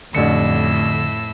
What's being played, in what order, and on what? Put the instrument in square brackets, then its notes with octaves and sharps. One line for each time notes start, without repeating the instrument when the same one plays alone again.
[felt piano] A1 D4 C#7 [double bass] F2 [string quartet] A2 E6 [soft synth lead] D3